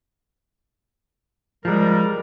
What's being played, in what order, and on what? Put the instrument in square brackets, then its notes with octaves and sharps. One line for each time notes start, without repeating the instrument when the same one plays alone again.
[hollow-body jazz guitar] F3 G#3 [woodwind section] G3 A#4